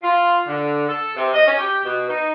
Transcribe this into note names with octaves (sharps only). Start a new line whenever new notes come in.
F4
D3
A4
C3
D#5
C#4
G4
B2
D#4